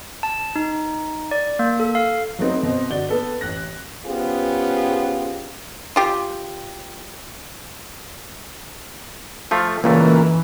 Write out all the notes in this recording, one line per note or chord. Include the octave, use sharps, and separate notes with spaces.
A5
D#4
D5
A#3
A4
F5
F#3 A3 B3 C4 D#4
B2 C4 C5
G1 F#4 D5 G7
B3 A4 B4
A1 F#6 A#6
B3 C#4 F4 G4 G#4 C5
F4 G4
F3 A3 F4
C#2 A#2 E3 A3 A#3